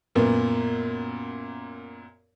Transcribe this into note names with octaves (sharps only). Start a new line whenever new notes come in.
F#2 A#2 B3